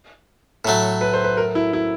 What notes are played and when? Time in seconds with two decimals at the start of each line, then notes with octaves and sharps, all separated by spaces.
0.65 A2 F#3 A3
1.01 B4
1.14 C5
1.24 B4
1.37 A#4
1.55 E4
1.73 E4